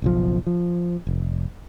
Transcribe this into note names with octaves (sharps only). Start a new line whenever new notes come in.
F#1 B1 F3
F3
F1